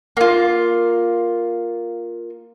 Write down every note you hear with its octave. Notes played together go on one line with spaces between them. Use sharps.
A#3 F4